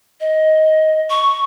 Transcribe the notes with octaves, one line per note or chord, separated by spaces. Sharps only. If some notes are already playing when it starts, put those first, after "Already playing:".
D#5
C#6